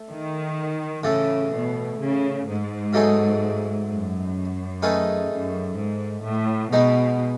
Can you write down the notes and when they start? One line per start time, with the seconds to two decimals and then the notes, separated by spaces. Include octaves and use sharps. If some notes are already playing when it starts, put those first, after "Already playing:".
Already playing: A3
0.09 D#3
1.03 A2 C#3 E3 A3
1.52 B2
1.99 C#3
2.47 G#2
2.93 B2 F#3 A3 D#4 G#4
3.88 F#2
4.83 D#3 A3 D#4 G#4 B4
5.31 F#2
5.78 G#2
6.25 A2
6.72 B2 G#3 B3 D#4